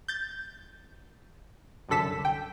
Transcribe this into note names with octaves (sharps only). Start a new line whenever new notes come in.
G6 A6
C2 F#2 D3 A4 B6 E7
G5